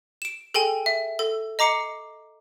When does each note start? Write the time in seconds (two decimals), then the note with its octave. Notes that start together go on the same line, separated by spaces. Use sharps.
0.22 D7 E7
0.54 G#4 A4 G5 G#5
0.86 E5
1.19 A4
1.59 D#5 A#5 D6 C7 C#7